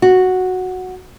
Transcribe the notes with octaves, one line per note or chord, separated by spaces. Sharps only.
F#4